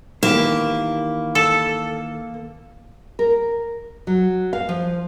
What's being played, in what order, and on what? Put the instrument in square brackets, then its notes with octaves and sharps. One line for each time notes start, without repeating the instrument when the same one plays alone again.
[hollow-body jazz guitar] D#3 E3 G4 [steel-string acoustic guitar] A#3
[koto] A4
[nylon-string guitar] A#4
F#3
F5
F3